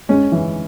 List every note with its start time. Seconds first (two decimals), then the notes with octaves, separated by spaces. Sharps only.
0.09 G#3 C#4
0.32 E3